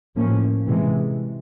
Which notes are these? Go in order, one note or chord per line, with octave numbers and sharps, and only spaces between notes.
A2 F3 A#3 C#4
C3 E3 G#3